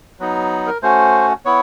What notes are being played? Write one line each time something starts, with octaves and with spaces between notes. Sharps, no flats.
F#3 B3 D#4
A#4
A3 C#4 F#4 C5
B3 E4 C#5